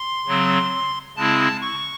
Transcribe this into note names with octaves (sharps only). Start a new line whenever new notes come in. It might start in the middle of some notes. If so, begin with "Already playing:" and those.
Already playing: C6
C#3 F#3 C4
C#3 G#3 C4 E4 A5
C#6